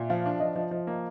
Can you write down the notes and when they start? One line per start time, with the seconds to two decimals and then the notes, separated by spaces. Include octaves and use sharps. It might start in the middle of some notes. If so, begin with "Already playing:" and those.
Already playing: A#2 E5
0.10 F3 F5
0.26 D4
0.40 F3 D#5
0.56 F3
0.71 F3
0.87 A#3